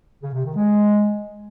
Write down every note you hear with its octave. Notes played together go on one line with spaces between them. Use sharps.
C#3
C3
D#3
G#3